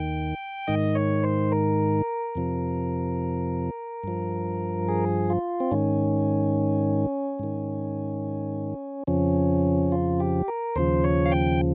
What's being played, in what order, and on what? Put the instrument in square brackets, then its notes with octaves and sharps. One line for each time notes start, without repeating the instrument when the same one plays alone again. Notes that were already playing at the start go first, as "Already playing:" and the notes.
Already playing: [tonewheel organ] D#2 D#3 G5
G#2 D#3 D#5
C#5
C5
A#4
F2 C3 F3
G2 F3
G#4
F4
C4
G#2 D#3 C#4
G#2 D#3
F2 C#3 F3 C#4
F4
G4
A#4
D#2 C#3 F3 C5
C#5
F5
G5